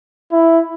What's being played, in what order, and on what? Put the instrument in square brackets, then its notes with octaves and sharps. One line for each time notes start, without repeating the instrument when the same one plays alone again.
[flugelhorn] E4